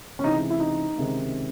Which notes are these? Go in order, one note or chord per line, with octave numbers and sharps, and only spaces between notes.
C#4
C#2 C3 E3 D#4
E4
D#4
C#2 C3 D#3